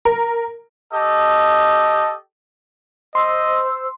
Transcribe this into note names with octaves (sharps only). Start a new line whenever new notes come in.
A#4
G4 A4 D#5
C5 D#5 C6 E6